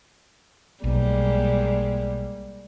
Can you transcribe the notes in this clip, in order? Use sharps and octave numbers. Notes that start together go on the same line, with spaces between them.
B1 G3 G#3 A#3